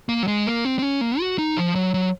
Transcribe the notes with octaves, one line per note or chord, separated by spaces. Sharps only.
A#3
F#3
G#3
A#3
C4
C4
C#4
A#3
F#4
D#4
F3
F#3
F#3